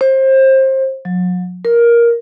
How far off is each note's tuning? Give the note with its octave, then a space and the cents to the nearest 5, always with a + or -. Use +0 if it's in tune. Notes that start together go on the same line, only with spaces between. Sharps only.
C5 +25
F#3 -40
A#4 +10